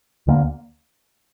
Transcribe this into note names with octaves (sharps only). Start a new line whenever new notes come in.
D2 D3 G3 A#3